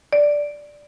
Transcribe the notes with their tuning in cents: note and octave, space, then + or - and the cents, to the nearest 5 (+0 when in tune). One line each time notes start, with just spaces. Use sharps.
D5 +0